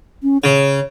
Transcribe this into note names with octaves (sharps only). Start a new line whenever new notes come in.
C#4
C#3 C#5